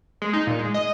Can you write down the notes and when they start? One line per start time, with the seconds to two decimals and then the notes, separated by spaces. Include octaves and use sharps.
0.22 G#3
0.33 D#4
0.47 A#2
0.59 G#3
0.74 D#5